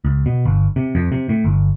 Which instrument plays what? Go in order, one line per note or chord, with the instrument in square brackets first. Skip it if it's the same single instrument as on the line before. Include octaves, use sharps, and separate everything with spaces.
[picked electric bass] C#2
B2
G1
C3
F2
C3
A2
G1